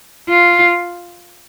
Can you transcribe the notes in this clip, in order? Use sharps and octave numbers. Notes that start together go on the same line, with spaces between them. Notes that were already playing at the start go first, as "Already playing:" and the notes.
F4